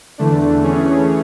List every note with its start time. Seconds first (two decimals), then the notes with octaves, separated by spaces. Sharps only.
0.18 E2 D3 A3 D4
0.62 E3 A3 C#4 G#4 C#5